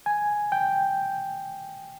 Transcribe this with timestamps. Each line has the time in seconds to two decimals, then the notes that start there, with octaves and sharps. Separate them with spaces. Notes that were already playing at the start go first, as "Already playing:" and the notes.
0.06 G#5
0.52 G5